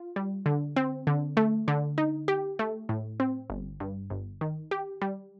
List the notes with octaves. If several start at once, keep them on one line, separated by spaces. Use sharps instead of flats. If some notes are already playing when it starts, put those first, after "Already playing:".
Already playing: F4
G3
D3
C4
D3
A3
D3
D#4
G4
A3
A2
C4
G1
G2
G1
D#3
G4
G3